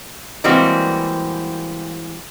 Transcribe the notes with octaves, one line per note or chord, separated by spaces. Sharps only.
E3 G3 G#3 A#3 C4 F#4